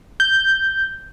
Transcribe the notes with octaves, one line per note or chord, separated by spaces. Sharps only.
G6